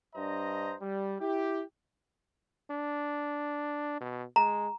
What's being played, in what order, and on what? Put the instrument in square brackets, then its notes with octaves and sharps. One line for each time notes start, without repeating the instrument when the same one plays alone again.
[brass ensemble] G2 D4 C5 D#5 A#5
G3
E4 G4
[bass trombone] D4
B2
[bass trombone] G#3 [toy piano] A#5